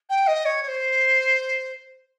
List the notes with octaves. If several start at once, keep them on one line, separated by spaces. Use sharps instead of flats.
G5
D#5
C#5
C#5
C5